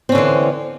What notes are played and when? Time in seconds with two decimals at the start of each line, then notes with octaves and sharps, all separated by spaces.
0.09 C4
0.12 C#4
0.15 D3
0.18 E3